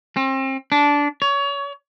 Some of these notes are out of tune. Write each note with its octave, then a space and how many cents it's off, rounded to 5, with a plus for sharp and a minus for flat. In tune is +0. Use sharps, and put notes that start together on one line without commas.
C4 +35
D4 -15
C#5 +25